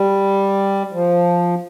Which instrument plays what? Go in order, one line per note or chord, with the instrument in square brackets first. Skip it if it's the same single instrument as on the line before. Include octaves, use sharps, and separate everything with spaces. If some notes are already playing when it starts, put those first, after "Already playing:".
Already playing: [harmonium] G3
F3